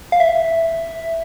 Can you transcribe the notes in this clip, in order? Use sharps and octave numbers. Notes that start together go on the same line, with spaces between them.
F5
E5